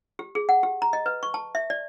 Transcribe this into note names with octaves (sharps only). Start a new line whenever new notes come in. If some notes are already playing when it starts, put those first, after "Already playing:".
G4
G#4
F#5
G4
A#5
D#5
B4
C#6
A5
E5
D5